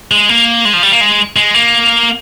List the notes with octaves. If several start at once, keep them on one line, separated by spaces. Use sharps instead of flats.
G#3
A#3
G#3
F3
G3
A#3
G#3
G#3
A#3